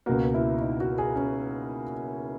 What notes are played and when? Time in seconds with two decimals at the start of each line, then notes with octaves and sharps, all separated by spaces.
0.06 C#2 B2 A#3 F#4
0.34 E4
0.61 D#4
0.80 F#4
0.98 G#4
1.16 C#4